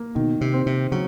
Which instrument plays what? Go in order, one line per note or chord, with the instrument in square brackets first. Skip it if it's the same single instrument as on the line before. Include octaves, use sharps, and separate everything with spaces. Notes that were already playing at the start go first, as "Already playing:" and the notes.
Already playing: [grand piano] A#3
[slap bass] B2 [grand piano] D#3
[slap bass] C3
[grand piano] C4
[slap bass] C3
[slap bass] C#3 [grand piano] F#3